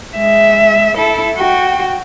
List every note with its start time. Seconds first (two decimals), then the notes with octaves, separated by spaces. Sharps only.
0.17 G#3 E5
0.97 E4 A4
1.37 F#4 G5